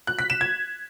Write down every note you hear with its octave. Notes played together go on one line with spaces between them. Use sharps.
F#6
B6
E7
G#6